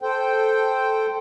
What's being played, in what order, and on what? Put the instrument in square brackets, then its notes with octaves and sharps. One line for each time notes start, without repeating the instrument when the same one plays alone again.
[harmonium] A4 C5 G5